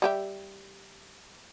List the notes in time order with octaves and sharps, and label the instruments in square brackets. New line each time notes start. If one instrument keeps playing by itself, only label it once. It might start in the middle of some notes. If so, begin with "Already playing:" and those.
[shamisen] G3 G4 E5